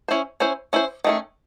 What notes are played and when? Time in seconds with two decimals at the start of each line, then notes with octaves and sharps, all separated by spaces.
0.08 C#4 E4 C5
0.40 C#4 E4 C5
0.73 C#4 E4 C5
1.04 D#3 A3 C#4